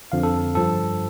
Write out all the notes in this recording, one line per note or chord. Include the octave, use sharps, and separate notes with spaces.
F2 D3 F3 F5
A4
G2 F3 A4